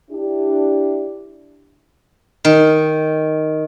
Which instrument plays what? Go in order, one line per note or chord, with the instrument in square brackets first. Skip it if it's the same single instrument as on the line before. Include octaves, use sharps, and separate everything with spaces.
[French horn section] D4 E4 G4
[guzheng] D#3